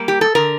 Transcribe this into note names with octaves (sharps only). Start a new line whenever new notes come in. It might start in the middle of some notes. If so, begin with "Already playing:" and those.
Already playing: G3 A#3
G4
A4
D3 A#4